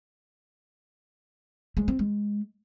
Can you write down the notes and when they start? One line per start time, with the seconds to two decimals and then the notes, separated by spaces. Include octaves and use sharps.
1.77 G#3
1.88 C4
1.99 G#3